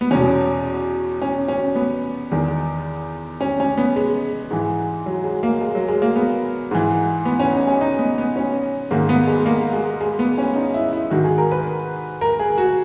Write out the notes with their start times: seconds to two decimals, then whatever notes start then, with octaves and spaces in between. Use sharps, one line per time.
0.01 B3
0.11 E2 B2 C#4
1.22 C#4
1.48 C#4
1.76 B3
2.31 E2 D#3
3.41 C#4
3.60 C#4
3.77 B3
3.96 G#3
4.51 G#2 E3
5.06 F#3
5.24 G#3
5.43 A#3
5.61 G#3
5.75 F#3
5.88 G#3
6.02 A#3
6.16 B3
6.71 G#2 E3
7.25 B3
7.39 C#4
7.53 D#4
7.67 C#4
7.81 D#4
7.99 B3
8.18 B3
8.36 C#4
8.91 G#2 D#3 A#3
9.09 B3
9.27 G#3
9.46 A#3
9.73 G#3
10.01 G#3
10.19 B3
10.38 C#4
10.56 D#4
10.74 E4
10.93 E4
11.11 G#2 D#3 F#4
11.24 G#4
11.38 A#4
11.51 B4
12.21 A#4
12.39 G#4
12.58 F#4